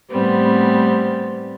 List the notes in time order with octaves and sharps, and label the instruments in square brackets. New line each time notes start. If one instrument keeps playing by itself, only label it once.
[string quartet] A2 G3 B3 C4